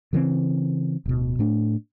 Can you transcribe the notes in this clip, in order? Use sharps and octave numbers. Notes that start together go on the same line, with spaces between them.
C#3 E3 F#3 C4
D1 B2
A2 A3 D4